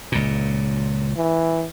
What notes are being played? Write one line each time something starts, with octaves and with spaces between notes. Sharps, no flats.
C#2 A#2
E3